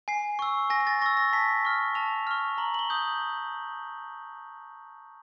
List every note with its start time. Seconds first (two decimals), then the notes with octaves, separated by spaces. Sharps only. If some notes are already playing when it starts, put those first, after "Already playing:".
0.08 G#5 C7
0.39 C#6 E6
0.70 G#5 A#6
0.80 A#6
0.87 A6
1.01 C#6 E6 A#6
1.17 A#6
1.33 A5 B6
1.65 C#6 F6
1.95 A5 F7
2.27 C#6 F6
2.58 A#5 F#7
2.74 F#7
2.79 G7
2.90 D#6 G6